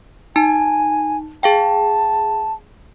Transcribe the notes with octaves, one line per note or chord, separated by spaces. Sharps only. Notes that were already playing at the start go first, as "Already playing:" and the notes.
D#4 G#5 A5
G#4 F5 G5 A5